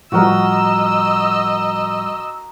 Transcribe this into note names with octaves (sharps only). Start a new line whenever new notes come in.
A2 F3 G3 F#4 A#4 D#5 E6